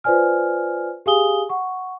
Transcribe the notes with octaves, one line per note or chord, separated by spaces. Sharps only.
F4 B4 C5 D5 G#5 F6
G4 G#4 F5 G#5 D#6 G7
F#5 C#6